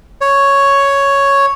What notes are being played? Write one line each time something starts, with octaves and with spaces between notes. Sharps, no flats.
C#5